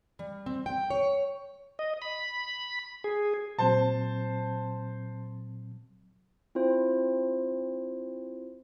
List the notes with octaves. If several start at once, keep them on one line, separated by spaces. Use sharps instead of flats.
G3
C4
G5
C#5
D#5
B5
G#4
A#2 F#3 C4 C5 A5
C4 E4 F4 C5